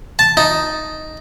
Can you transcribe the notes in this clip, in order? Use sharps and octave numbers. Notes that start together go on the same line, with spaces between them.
A5
D#4